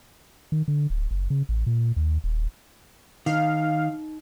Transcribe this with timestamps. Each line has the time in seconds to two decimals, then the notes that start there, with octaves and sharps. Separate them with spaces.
0.52 D#3
0.68 D3
0.90 D1
1.11 F#1
1.30 C#3
1.49 A1
1.67 A#2
1.96 D#2
2.24 D#1
3.26 D#3 D#4 F5